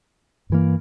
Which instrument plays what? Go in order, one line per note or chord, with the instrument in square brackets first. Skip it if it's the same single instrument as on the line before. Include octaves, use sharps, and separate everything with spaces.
[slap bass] G2 E3 A#3